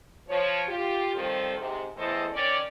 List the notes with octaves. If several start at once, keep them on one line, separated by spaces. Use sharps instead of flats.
F3 C#5
F4 G4
D#3 F3 G3 C4 A4 C5
G#2 C3
E2 A2 E3 A4 C5 D#5
D#3 C#4 C#5 D5